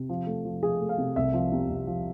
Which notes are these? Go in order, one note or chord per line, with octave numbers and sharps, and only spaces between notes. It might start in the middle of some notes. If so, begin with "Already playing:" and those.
Already playing: C3
F3
A3
F3
F3 G#4
A3
F5
C3
C2 E5
F3
C3
C2
F3